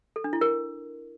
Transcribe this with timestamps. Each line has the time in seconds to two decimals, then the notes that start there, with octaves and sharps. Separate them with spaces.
0.16 A4
0.24 D4
0.33 E4
0.41 A#4